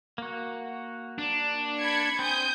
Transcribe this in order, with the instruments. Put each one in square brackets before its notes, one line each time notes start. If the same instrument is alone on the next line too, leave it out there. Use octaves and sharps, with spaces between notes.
[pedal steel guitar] A#3 F#4
[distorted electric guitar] D4
[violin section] B5 G#6 C#7
[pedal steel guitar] C4 [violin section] G#5 D#6 G6